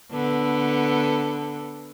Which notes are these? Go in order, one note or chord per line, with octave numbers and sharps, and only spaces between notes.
D3 B3 A4